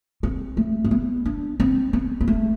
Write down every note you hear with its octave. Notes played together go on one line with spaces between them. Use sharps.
C4
A3
C4
B3
D4
C4
B3
B3
A3